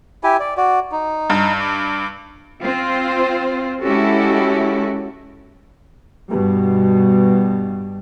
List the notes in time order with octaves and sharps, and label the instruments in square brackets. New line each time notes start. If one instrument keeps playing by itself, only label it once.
[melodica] E4 G4 G#5
D5
F#4 D5
D#4
[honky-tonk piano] G2
[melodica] D6
[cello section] C4 F4 C5
G#3 C#4 E4 F#4 G4 A4
[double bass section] G2 B2 G3